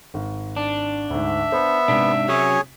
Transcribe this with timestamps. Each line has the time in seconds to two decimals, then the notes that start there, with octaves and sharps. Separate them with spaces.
0.14 G#1
0.57 D4
1.10 D2 G#2 E5
1.52 B3 C5
1.88 G#2 C3 D4 B6
2.28 F#3 C#4 G#4 C#5 G#5